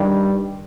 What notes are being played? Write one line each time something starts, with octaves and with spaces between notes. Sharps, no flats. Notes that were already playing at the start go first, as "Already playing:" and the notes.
Already playing: G2 D#3 G3